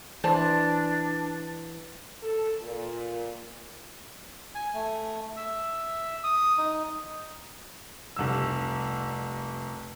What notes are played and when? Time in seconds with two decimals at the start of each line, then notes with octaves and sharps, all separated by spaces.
0.24 E3 D4 C5 D5 A5
2.23 A4
2.62 A#2
4.55 G#5
4.74 A3
5.36 E5
6.24 D#6
6.58 D#4
8.16 F1 C2 E6